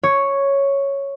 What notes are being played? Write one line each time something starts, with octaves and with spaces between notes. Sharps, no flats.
C#5